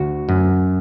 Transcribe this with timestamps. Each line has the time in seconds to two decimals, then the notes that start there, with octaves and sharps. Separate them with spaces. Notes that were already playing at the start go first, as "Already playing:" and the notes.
Already playing: D2 F#4
0.29 F#2